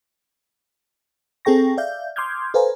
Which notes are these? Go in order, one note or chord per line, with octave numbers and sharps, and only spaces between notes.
C4 G#4 A4 G5 C#6 A#6
D5 E5 F5 G6
C6 D6 D#6 F6 G6 G#6
A4 B4 C5 F5 G#5 A#5